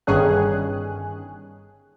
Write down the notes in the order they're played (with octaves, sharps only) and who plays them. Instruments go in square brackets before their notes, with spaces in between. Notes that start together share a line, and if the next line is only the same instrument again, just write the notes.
[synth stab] G1 G2 D#3 C#4 G#4 F#6